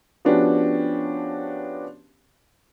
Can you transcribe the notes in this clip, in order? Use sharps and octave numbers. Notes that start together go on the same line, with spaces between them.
F3 B3 C#4 D4 F#4 G4